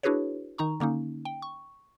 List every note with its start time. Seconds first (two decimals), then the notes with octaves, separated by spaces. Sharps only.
0.03 D4 E4 F#4 G#4 B4 C#5
0.58 D#3 D#4 A#5 C#6
0.80 D3 A#3 C#4 D#4
1.25 G5
1.42 C#6